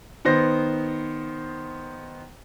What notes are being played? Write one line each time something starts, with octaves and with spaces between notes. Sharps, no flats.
D#3 B3 C5 A#6